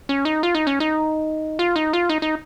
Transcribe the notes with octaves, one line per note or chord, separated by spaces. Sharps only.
C#4
D#4
F4
D#4
C#4
D#4
F4
D#4
F4
D#4
D#4